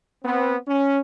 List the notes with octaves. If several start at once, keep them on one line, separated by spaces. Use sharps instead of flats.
B3 C4
C#4